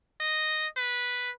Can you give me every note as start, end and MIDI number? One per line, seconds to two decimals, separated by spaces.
0.20 0.66 75
0.77 1.31 71